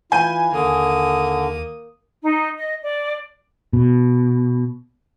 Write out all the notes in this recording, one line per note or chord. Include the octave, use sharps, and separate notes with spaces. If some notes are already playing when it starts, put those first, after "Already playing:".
E3 F4 B4 G#5 G6 D#7
D#2 D3 A#3 D#6
D#4
D#5
D5
B2